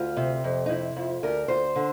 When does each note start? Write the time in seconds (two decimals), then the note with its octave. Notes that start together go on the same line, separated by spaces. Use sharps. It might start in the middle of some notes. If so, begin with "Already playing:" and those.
Already playing: D2 F4
0.17 C3
0.44 F2
0.66 D#4
0.69 C3 E4
0.96 F2
1.23 D2 A#4
1.48 D2 C5
1.75 D3